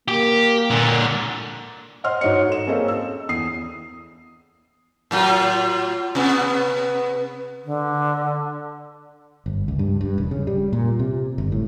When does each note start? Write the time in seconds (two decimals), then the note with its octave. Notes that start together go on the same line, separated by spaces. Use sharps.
0.08 A#3 G4
0.70 A#2 D3
2.04 C5 D#5 F#5 C6 F6
2.21 G#2 F#4 C#5 D#5 C#7
2.48 A4 E7
2.67 A#3 C4 C#4 G#4 A4 D#5
2.88 E6
3.29 E2 D#6 C7
5.11 A2 F#3 F4
6.15 C3 B3
7.65 D3
9.46 G1
9.68 C#2
9.79 G2
10.01 G2
10.18 E1
10.31 C#3
10.47 G3
10.73 A#2
10.99 C3
11.38 G1
11.52 A2